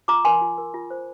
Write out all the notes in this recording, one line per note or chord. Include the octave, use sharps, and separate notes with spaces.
F4 A#5 D6
A#4 G#5 C6
F4
A#4
F4
C5